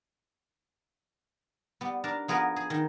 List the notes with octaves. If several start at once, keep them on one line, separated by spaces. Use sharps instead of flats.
G3 B3
D4 A#4 A5
F3 B3 G#4 A#4 B4
G#4
D#3